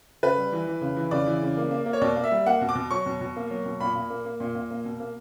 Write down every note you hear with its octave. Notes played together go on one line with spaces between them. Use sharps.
C#3 B4
G3
E3
E3
C#3
E3
C#3 D5
E3
C#3
A#3
A#3
A#3
C#5
B2 D5
A#3
E5
G3
A#3 F#5
B2
D6
B2
F#3 C#6
B2
B2
A#3
F#3
B2
A#2 B5
A#2
A#3
A#3
A#2
A#2
A#3
B2
A#3